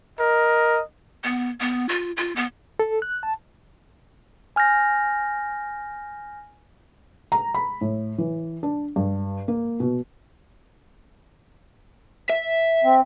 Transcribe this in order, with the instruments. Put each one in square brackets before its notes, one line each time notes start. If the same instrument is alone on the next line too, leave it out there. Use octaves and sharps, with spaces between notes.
[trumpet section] A#4 D#5
[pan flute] B3
B3
F4
F4
B3
[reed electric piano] A4
F#6
A5
[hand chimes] G#5 F6 G6 A#6
[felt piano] A#5
B5
A2
E3
D4
G2
A#3
B2
[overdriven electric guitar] E5
[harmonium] C4